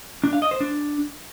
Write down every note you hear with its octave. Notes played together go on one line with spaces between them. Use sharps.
D4
F5
D#5
C5
D4